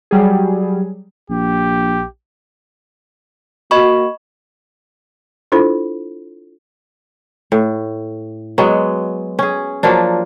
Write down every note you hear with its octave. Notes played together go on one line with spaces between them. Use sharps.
F#3 G3 G#4
A#1 G4
A#3 F#4 D#5 B5 C#6
D4 E4 F4 A4 C5 B5
A2
F#3 G#3 B3
C#4 G#4
F3 F#3 A#3 D4